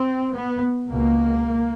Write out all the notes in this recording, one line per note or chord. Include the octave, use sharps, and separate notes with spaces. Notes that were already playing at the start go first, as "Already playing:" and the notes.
Already playing: C4
B3
C#2 B2 A#3